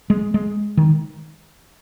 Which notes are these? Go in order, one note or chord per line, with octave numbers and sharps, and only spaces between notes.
G#3
G#3
D#3